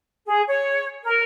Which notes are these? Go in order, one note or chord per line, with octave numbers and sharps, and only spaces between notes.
G#4
C#5
A#4